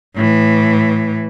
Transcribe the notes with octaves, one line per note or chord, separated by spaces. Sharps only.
A2 E3